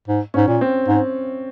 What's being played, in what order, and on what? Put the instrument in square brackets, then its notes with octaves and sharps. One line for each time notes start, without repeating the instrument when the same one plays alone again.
[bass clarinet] G#2
[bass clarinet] G#2 [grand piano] C#4
[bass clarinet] A#2
[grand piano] C4
[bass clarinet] G#2